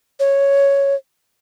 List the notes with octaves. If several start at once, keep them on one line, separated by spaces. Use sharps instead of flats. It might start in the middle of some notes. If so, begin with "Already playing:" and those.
C#5